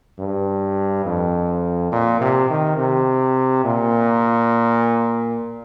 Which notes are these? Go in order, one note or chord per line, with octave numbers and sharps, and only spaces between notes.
G2
F2
A#2
C3
D#3
C3
A#2